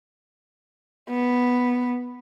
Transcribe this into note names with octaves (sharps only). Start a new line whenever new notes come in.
B3